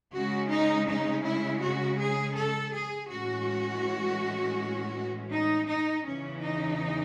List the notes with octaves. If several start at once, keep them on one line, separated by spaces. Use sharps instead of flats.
C#3 G#3 C#4 F#4
D#4
D#4
E4
F#4
G#4
A4
G#4
A2 E3 G#3 C#4 F#4
D#4
D#4
E2 C#3 E3 C#4
D#4